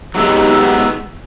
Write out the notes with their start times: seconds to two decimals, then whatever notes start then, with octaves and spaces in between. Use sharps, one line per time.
0.15 F#3 G#3 B3 D#4 G4 E6